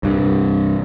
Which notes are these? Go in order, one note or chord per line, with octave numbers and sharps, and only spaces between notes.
C2 G2